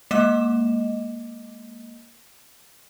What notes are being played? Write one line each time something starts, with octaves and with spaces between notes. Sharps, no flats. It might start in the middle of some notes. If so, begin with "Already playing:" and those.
G#3 A#3 D#5 D6 E7